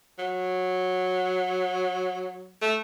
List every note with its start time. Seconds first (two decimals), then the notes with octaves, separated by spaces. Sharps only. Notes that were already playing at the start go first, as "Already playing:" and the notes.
0.19 F#3
2.62 A3